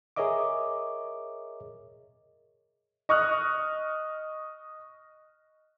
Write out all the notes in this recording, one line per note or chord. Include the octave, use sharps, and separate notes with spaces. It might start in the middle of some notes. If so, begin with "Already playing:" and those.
G#4 A#4 C#5 D#5 E5 D6
D#5 C#6 D#6 F6 F#6